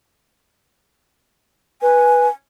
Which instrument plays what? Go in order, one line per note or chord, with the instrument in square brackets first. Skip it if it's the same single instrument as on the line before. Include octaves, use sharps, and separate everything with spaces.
[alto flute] B4 [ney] G#5